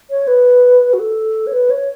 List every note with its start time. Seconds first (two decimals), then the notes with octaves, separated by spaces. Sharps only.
0.10 C#5
0.27 B4
0.93 F#4
1.00 A4
1.47 C#5
1.53 B4
1.70 C#5